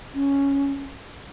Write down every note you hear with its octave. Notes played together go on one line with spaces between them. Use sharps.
C#4